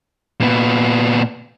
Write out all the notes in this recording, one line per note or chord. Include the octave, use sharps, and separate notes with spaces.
A#2 B3